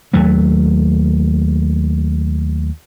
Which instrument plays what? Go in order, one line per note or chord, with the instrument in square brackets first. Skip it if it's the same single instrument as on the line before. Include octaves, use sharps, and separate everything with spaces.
[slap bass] D#2 F#3 A3